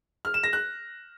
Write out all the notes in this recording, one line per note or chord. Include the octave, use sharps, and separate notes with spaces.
F6
E7
A#6
F#6